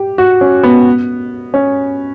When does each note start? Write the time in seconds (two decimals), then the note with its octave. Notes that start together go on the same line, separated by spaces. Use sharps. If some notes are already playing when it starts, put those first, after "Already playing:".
Already playing: G4
0.18 F#4
0.41 C#4
0.63 B3
1.54 C#4